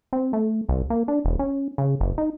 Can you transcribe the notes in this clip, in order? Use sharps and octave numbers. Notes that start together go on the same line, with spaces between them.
C4
A3
C2
A#3
D4
E1
C#4
C#3
F#1
D#4